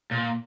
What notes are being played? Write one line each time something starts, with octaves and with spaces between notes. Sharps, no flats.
A#2